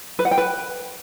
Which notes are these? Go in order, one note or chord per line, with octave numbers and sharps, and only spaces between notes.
B4
F#5
G5
B4